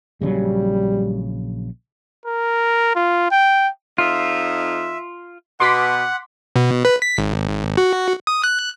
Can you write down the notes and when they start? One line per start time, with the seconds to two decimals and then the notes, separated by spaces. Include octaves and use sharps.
0.21 A#1 C#3 F#3 G3
2.25 A#4
2.95 F4
3.31 G5
3.98 F2 D#4 F4 E5
5.60 B2 F#5 C6 D6 B6
6.56 B2
6.85 B4
7.02 B6
7.18 G#1
7.77 F#4
8.27 D#6
8.44 F#6